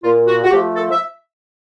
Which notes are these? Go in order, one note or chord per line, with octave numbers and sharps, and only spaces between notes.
A#2 F4
F#4
F#4
F3 A3 G4
A4
E5